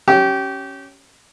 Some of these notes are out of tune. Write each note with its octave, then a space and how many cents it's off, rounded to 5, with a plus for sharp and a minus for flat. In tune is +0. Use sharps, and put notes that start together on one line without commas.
C#4 +0 G4 -25